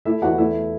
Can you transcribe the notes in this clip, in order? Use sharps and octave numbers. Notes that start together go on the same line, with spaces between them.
A3 E4 E5
E2 F#4 F#5
A3 E4 E5